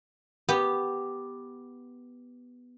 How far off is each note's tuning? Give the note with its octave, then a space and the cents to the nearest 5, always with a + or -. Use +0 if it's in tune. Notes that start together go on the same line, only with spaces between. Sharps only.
B3 +0 G4 +0